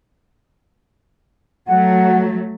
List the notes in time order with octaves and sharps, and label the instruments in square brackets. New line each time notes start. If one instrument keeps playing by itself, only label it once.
[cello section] F#3 A3 [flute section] F#5